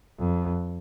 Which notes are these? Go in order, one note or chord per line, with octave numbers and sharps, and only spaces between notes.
F2